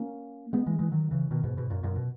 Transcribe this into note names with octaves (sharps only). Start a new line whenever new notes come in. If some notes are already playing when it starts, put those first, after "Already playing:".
Already playing: A#3 C#4
G#3 B3
E3 G#3
E3 G#3
D#3 F#3
C#3 E3
B2 D#3
G#2 B2
G#2 B2
F#2 A#2
F#2 A#2
B2